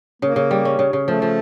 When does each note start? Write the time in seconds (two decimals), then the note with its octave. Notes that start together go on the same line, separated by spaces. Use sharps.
0.22 C#3 A#3
0.36 C#3
0.51 G3
0.65 C#4
0.79 C#3
0.93 C#3
1.07 F3 A3
1.22 F3